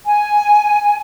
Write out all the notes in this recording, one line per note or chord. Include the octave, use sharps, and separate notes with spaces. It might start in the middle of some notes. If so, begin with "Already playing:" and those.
G#5